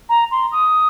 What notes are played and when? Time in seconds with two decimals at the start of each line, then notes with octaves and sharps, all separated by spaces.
0.09 A#5
0.31 C6
0.52 D#6